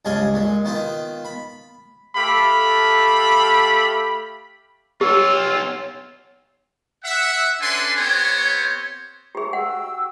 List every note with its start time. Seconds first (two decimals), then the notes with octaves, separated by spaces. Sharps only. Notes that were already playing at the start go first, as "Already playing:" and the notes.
0.05 C#2 G2 G#4 D#5 F5
0.34 A#2 G#3
0.65 D#3 B3 D#4 F4
1.25 B5
2.16 A3 G4 A4 F5 B5
5.01 B3 F4 G4 C#5 E6
7.04 E5 F#5
7.62 C#4 D4 A4 B4 G#5 C6
7.97 B3 C4 G4 C5 C#5
9.35 G4 G#4 E5 D#6
9.53 F#4 F#5 G5 E6